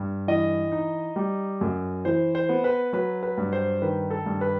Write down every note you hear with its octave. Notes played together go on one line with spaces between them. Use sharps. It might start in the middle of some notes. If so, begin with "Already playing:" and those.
Already playing: G2
E3 D#5
D#4
G3
F#2
E3 C5
C5
B3
B4
F#3 B4
B4
G2
C5
D#3 B4
A4
G2
B4